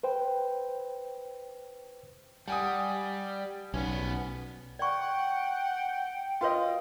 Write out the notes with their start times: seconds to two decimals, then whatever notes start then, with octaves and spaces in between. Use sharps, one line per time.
0.03 B4 C5 G5
2.48 G3 F#5 G#5 D#6
3.74 B1 B3 C#4
4.79 D5 F#5 G5 C#6
6.41 F4 F#4 B4 C#5 D#5